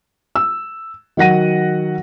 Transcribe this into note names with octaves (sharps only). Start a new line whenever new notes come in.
E6
D#3 F#3 F#5 A#6 D#7